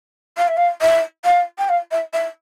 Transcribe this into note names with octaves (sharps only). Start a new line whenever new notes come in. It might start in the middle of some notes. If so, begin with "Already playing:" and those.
F5
E5
F5
E5
F5
G5
F5
E5
E5